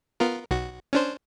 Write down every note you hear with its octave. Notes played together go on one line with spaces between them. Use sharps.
B3 F4 A#4
B1 F#4
C#4 D4 C5